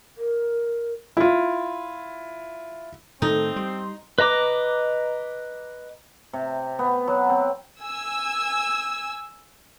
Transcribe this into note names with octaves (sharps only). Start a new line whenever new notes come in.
A#4
E4 F4
A2 D#3 A3 C4 D#4 A4
G3 C6
B4 D#5 A#5 D6
C3
B3
F#3
C4
G#5 E6